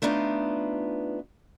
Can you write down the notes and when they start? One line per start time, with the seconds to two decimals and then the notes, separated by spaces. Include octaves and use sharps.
0.02 A3 B3 D4 D#4 F4